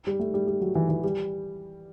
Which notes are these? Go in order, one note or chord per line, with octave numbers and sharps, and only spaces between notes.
G3
A3
G3
G3
F#3
E3
E3
G3